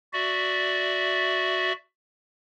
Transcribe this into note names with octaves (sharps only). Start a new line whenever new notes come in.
F#4 D5 E5